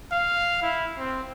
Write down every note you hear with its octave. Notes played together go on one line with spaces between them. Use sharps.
F5
E4
C4